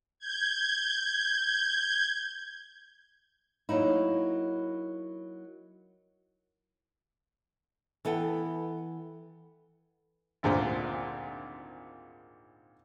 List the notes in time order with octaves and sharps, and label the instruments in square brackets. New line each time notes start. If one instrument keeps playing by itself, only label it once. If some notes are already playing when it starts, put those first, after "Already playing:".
[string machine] G6 G#6
[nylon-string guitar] F#3 A#3 D#4 E4
E3 B3 A4 G5
[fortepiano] G#1 D2 A#2 C5